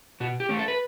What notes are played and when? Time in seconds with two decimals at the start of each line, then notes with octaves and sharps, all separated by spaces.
0.20 B2 F#4
0.40 G4
0.49 A3 C#4
0.59 A4
0.68 B4